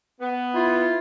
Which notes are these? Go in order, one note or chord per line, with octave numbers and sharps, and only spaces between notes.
B3
E4 F4